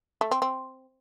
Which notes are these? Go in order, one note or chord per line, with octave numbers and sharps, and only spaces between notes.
A3
C4
C4